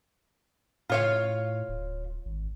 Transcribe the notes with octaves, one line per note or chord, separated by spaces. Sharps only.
A2 F4 C#5 F5
D1
G#1